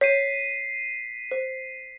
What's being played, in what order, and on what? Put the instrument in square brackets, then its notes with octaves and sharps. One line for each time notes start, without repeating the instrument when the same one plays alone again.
[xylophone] C#5 [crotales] B6 C7 D#7
[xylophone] C5